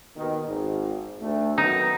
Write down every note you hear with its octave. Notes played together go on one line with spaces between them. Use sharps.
D#2 B2 D#3
G#1
D2 A3
D#3 F#3 B3 D#4